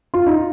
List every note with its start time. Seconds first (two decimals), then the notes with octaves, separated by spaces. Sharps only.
0.14 F4
0.26 D#4